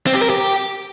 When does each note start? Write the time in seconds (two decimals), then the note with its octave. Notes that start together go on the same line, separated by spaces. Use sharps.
0.07 C4
0.14 G4
0.22 A#4
0.30 G4